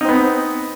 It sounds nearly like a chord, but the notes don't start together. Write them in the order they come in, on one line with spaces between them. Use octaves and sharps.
D#4 C4 B3